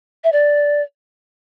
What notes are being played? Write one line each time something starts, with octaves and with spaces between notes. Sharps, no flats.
E5
D5